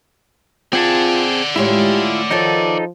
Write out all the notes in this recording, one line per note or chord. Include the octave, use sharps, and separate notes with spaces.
C4 F4 G#4 D5 F#5 A5
A2 G#3 E4 F4 G4 C#5
D#3 F3 D#4 F#4 A4 C#5